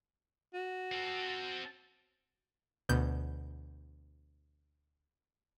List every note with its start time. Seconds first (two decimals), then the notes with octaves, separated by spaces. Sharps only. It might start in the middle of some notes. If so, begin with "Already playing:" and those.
0.54 F#4
0.92 C4 A4
2.89 D2 B2 G6